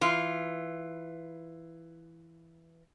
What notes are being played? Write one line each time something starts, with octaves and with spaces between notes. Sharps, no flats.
E3 F4